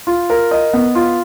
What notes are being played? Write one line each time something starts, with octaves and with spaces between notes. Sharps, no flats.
F4
A#4
D#5
B3
F4